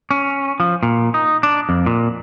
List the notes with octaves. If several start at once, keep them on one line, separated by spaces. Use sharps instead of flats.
C#4
F3
A#2
D#4
D4
F2
A#2